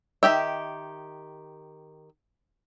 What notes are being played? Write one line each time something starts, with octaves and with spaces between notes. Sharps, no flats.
D#3 C4 G4 E5